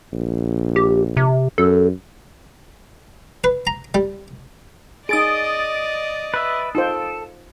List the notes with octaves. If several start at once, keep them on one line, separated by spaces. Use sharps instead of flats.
A#1
G4
C3
F#2 A4
B4
A#5
G3
D#4 G#4 D5 D#5 D#6 A6 D7
B4 E5
D#4 F4 A4 C5